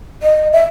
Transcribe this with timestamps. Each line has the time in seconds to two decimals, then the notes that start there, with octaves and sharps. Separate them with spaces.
0.23 D#5
0.53 E5